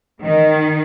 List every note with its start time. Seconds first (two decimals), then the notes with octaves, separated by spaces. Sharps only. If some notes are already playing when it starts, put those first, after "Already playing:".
0.23 D#3